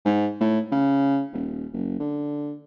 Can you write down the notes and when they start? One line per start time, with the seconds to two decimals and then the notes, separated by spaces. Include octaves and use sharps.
0.06 G#2
0.41 A2
0.72 C#3
1.33 D#1
1.73 F#1
2.00 D3